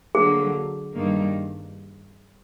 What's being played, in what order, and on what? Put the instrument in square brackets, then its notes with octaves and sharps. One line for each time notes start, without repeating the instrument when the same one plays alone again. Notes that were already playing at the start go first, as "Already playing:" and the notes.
[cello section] D3 F#3 A#3 [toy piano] G#4
[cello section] G2 D#3 G3 A#3